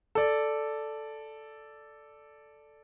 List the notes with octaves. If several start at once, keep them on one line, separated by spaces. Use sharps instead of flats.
A4 D5